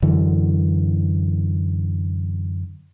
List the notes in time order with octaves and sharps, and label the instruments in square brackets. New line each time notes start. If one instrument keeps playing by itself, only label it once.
[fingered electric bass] F#2 D3 E3